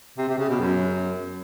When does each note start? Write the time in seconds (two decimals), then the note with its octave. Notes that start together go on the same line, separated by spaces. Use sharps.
0.18 C3
0.28 C3
0.39 C#3
0.49 B2
0.60 F#2